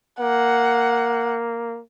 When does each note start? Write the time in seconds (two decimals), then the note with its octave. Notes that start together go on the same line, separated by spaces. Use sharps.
0.20 A#3 F#5